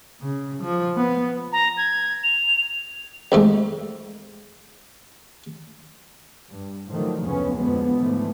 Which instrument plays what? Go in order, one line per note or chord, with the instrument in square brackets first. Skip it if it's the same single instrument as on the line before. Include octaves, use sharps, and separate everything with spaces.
[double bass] C#3
F3
B3
[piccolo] A#5
G#6
F7
[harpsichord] C2 G#2 A3
[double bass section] G2
A2 D3 D#3 F3 F#3 A3
F1 D2 C#3 B3 C#4
F2 B2 D3 F3 G#3 B3
G#2 D3 E3 F3 A3